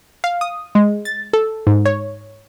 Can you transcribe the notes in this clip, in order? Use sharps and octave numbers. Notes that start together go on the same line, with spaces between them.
F5
D#6
G#3
A6
A4
G#2
C#5